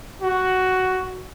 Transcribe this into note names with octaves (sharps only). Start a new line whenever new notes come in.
F#4